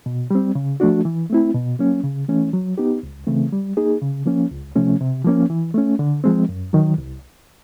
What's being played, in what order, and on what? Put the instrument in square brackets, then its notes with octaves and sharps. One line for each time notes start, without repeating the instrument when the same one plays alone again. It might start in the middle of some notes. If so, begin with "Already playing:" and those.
[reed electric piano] B2
G3 C4
C#3
F3 A3 D4 F#4
E3
A3 C4 E4
B2
F#3 A#3 C#4
C#3
E3 A3 C#4
F#3
B3 D#4 G4
C#2
C#3 E3 A3 C4
G3
A#3 D#4 G#4
C#3
F3 A#3 C#4
C#2
C3 F3 A3 C#4
C3
F3 A#3 C#4
E3
A3 C#4
D3
F3 G#3 C4
F#2
D#3 F#3
C2